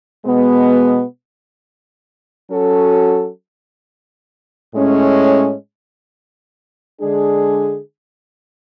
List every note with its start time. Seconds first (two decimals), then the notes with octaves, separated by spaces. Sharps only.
0.25 B2 G#3 B3
2.50 F#3 C#4 F#4 A4
4.74 A2 G#3 C#4
7.00 D3 G#3 D4 G#4